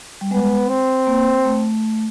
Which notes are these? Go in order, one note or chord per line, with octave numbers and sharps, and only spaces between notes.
G3
G#3 B3
C4
A#3
A3